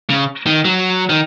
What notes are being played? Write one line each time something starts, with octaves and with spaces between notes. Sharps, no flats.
C#3
D#3
F#3
D#3